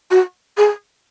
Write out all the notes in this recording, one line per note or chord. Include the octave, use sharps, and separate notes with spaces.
F#4
G#4